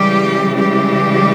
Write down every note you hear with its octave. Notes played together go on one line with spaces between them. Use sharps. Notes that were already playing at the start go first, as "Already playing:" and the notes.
Already playing: C#3 E3 G3 G#3 G4
G3 G4